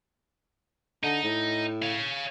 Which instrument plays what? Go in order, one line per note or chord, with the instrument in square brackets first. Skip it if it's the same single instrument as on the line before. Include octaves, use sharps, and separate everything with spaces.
[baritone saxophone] D3 [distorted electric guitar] D#4
[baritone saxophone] A2
[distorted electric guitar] C#5 F5